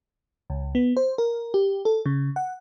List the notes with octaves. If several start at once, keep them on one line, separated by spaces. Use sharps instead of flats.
C#2
B3
C5
A#4
G4
A4
C#3
F#5